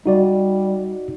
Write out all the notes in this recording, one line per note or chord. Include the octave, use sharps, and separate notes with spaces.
G3 D#4 F#4 D5